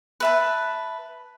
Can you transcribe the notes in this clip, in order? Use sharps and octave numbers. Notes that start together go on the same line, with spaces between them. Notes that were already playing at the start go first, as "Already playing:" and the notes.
B4 E5 A5